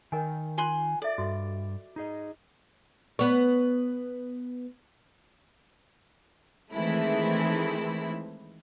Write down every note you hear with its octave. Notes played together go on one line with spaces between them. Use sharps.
D#3 A#4 D#5 G5 G#5
F4 G#5 C6 F#6
A4 D5 E5
G2 F#4 D#5
D#4 G#4 D#5
B3 C#5
D#3 E3 G#3 A3 C4 E4